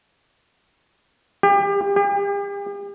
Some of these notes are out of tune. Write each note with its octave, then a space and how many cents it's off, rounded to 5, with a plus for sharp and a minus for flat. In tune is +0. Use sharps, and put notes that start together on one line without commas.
G4 +35
G4 +45